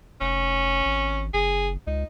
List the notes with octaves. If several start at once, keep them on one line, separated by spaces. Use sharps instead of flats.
F1 C#4
G#1
F#1 G#4
C#2 D#4